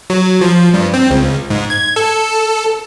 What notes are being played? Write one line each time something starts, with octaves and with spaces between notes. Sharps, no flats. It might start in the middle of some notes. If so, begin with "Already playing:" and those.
F#3
F3
G2
C4
C#2
G#2
G#6
A4